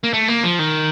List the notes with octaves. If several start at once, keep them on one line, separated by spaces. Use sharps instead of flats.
A#3
A3
A#3
F3
D#3